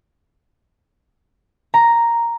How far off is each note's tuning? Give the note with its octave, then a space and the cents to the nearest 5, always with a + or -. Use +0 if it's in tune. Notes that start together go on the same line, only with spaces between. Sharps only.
A#5 +0